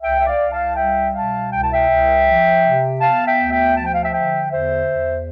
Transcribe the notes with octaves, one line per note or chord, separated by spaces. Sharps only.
C2 E5 G5
E5
D5 F5
C2
F5 A5
G3 E5 G5
B2 F5 A5
C2 G5
A5
E5 G5
C2
F3
C3
B3 F5 A5
E5 G5
D2
E5 G5
F3 A5
G5
F5
E5 G5
D3 E5 G5
E2 C5 E5
E2